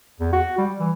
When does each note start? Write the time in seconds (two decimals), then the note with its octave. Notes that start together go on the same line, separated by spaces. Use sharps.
0.20 E2
0.33 F#4
0.58 G3
0.80 E3